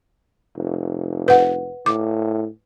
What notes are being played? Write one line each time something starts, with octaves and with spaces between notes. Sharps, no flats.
F1
B4 F#5
A2 D6